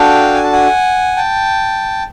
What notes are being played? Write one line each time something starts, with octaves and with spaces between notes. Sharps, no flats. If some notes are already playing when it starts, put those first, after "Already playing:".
Already playing: D4 F#4 A4 F5 G5
G#5
A5
F#5 G#5
G5 A5